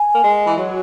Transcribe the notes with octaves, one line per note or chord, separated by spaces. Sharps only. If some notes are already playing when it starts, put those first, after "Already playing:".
Already playing: G#5
A#3
G#3
E3
F#3